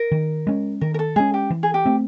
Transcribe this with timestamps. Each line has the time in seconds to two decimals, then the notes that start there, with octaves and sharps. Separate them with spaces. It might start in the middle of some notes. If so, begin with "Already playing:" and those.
Already playing: A#4
0.12 D#3
0.47 G#3 C#4
0.81 D#3 A#4
0.94 A#4
0.99 A4
1.16 G#3 C#4 G#4
1.34 G4
1.50 E3
1.63 G#4
1.74 G4
1.85 A3 C4